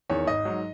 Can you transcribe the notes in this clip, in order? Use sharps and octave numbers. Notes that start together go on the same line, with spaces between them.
E2 D#3 C#5
G#1 D#5
G#2 F#3